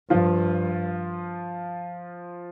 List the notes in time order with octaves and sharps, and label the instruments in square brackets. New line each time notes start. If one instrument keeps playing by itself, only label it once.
[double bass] G2 [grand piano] F3 F4